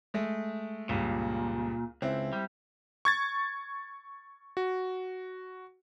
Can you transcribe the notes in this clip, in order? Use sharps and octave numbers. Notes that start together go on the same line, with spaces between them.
G#3 A3
C#2 G2 A#2
C#2 C4 E4
G3
C#6 G#6 A6
F#4